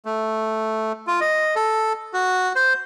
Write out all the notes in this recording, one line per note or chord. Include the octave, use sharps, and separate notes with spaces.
A3
F4
D#5
A4
F#4
C5